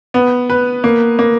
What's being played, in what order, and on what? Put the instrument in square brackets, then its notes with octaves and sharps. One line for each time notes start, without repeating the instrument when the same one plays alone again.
[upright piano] B3
B4
A#3
A#3